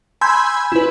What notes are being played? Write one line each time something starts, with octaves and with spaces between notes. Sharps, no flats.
G#5 B5 C6 E6 G6 G#6
E4 B4